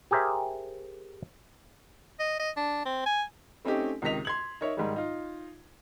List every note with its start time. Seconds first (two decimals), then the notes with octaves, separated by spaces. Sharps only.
0.11 G4 G#4 A#4 C5 E5
2.20 D#5
2.40 D#5
2.57 D4
2.85 C4
3.06 G#5
3.65 A3 C4 C#4 D#4 G4
4.02 C#2 C3 D#3 D#5 B6 F7
4.25 C6 G#6 F#7
4.61 D#4 A#4 C#5 E5
4.77 G#2 D#3 G3
4.96 D#4 F4